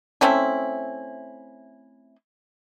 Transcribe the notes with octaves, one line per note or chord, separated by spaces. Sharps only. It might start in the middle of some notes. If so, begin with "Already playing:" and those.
A3 C4 C#4 E4